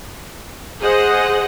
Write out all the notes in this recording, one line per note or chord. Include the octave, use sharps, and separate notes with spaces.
G#4 C5 D#5 F#5